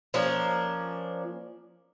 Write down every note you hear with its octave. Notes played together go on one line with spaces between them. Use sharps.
F3 A#3 C#4 D4